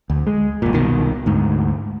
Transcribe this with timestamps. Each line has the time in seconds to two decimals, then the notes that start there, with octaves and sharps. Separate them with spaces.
0.10 D2
0.27 G#3
0.62 F#1 A#2
0.74 C2 B2 D#3
1.26 D2 G#2